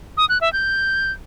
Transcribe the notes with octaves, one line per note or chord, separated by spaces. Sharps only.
D#6
F#6
E5
G6